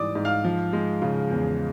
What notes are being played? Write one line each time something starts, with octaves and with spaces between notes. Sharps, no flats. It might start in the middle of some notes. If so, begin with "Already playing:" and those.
Already playing: G#2 E3 G3 D5 D6 D#6
G#2
F5 F6
F3
G#3
C#3
E2